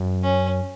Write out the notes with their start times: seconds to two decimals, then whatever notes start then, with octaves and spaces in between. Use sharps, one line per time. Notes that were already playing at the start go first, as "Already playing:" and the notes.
Already playing: F#2
0.23 C#4